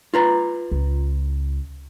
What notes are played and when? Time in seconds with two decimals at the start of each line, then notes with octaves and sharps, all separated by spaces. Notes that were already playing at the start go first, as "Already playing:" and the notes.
0.14 F4 B4 A#5
0.72 C#2